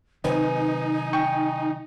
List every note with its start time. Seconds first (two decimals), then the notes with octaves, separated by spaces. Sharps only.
0.24 C3 D#3 F#3 C4 D#4 B4 D#5 G#5
1.13 G5 C#6 G6